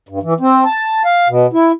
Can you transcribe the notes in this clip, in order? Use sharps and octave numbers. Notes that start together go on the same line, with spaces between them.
G2
E3
C4
A5
F5
B2
E4